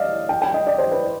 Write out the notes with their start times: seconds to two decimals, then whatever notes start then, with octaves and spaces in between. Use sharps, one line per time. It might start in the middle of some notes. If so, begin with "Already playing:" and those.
Already playing: D5 D#5 F5
0.29 G5
0.42 G5
0.54 D#5
0.67 D5
0.78 C5
0.92 B4